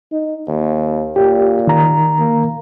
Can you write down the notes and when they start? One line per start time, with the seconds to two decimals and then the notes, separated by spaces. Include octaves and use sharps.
0.12 D#4
0.48 D#2
1.16 A#2 G4
1.67 D#3 A#5
2.19 A#3